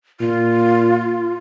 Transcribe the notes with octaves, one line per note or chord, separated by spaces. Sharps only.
A#2 F4